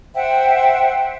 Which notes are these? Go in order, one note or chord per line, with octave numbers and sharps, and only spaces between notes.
C5 E5 F#5 G5